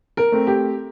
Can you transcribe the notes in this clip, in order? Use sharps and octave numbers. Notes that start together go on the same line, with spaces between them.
A#4
A3 C4
G4